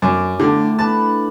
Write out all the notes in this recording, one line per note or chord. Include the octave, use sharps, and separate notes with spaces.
F#2 D5
A2 D3 A5
D4 B4 A5